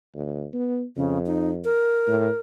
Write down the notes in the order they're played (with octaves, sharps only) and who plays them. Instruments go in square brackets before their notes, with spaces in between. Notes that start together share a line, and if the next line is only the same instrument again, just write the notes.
[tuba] D2
B3
[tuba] F2 [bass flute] C#3
[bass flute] D#4
A#4
[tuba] A2